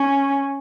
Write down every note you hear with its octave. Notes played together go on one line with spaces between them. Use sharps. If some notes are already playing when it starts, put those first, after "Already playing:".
Already playing: C#4